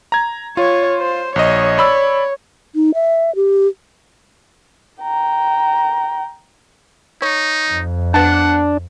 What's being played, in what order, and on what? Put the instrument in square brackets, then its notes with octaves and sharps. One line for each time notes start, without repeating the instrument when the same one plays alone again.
[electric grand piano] A#5 G#6
[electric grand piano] F4 [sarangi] C#5
[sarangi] C5
[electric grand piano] A#1 D#5 [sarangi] C#5
[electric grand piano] D5 B5 E6
[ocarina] D#4
E5
G4
[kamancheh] G5 A#5
[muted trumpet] D#4 [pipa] C#5
[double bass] F2
[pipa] B3 A5 [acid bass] D4 [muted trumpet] F#5